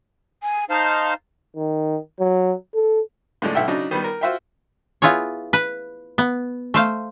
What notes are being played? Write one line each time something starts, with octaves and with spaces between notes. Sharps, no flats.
G#5
D#4 C5 F5 A5
D#3
F#3
A4
A2 D3 G#3 D4
B1 E5 F#5 G5 E6
C#3 F#3 D4 D#4
D#3 G3 B3
A#4
F4 F#4 C5 E5 F5 G5
B3 E4 F4 G#4 C#5
B4
B3
A3 C5 F5